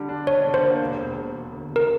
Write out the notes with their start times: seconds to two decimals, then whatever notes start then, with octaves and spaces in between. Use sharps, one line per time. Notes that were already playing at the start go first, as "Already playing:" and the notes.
Already playing: D3 G3
0.09 D4
0.27 D4 C#5
0.45 D3
0.54 C5
0.63 A#3
0.81 E1
0.99 E1
1.16 E1
1.34 E1
1.52 D2
1.69 E1
1.76 A#4